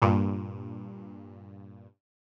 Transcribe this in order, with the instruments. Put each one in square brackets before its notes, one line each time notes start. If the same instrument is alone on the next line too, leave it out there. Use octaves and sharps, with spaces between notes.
[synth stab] G2 A#2